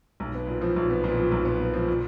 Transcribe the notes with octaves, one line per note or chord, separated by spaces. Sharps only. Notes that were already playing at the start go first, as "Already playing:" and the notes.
B1
B3
A#2
F3
B1
B3
A#2
F3
B1
B3
A#2
F3
A#2